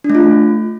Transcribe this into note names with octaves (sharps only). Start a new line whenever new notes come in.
D4
A3
F4